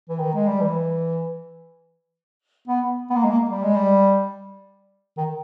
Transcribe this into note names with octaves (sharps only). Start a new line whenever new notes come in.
E3
D#3
G#3
G3
E3
B3
B3
A#3
G#3
A#3
G3
G#3
G3
D#3